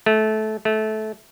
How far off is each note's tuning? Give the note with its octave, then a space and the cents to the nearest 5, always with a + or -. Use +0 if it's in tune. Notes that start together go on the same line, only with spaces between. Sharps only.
A3 -20
A3 -20